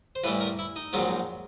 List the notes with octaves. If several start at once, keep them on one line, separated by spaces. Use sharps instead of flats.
C5
A1 A2 E3 G3 B4
A#4
E4
D#4
A#1 G#2 D#3 F#3